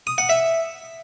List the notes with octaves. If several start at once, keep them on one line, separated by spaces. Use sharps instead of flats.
D#6
F#5
E5